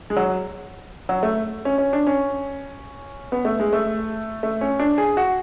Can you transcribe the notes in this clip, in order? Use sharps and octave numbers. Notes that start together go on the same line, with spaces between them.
G#3
F#3
F#3
A3
C#4
C#4
D4
C#4
B3
A3
G#3
A3
A3
C#4
D4
G#4
F#4